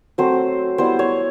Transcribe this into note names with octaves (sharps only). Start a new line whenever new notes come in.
F#3 A3 C4 C5
G3 B3 E4 C5
C#5